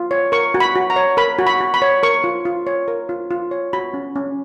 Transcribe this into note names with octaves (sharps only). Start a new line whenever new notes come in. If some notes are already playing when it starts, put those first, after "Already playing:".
Already playing: F4
C#5
A#4 C#6
F#4
B5
F#4
A#5
C#5
A#4 B5
F#4
B5
F#4
B5
C#5
A#4 C#6
F4
F4
C#5
A#4
F4
F4
C#5
F#4 B5
C#4
C#4